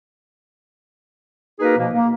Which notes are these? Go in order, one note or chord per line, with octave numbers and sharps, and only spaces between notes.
A#3 D#4 F#4 G#4 A#4 B4
B2 F3 A#3
A#3